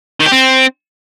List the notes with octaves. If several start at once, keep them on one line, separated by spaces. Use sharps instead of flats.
D#3
G4
C4